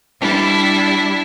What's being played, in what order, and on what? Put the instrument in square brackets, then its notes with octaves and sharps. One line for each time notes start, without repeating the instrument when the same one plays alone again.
[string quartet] G3 D4 E4